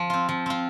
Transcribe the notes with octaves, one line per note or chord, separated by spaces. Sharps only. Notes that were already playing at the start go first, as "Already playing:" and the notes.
Already playing: F3
C4 F4
F3
C4 F4